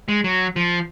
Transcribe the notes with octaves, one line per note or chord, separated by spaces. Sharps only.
G#3
F#3
F3